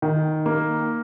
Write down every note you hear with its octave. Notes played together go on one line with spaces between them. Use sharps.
D#3
A#3